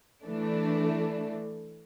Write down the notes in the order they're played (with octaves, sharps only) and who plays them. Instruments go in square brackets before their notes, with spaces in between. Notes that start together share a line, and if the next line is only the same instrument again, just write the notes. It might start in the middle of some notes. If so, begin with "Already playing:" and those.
[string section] E3 A3 D4